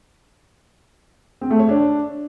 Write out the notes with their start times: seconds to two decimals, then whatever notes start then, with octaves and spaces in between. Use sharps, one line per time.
1.41 C4
1.51 A3
1.60 C#5
1.69 D4